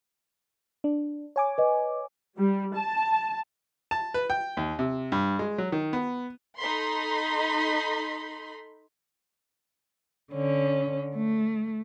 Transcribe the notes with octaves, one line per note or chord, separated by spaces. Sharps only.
D4
C#5 G#5 D6
B4 D#5
G3
A5
A5
B4
G5
D#2
C3
G2
G#3
F#3
D#3
B3
D#4 A4 B5 C6
D3 C#4
A3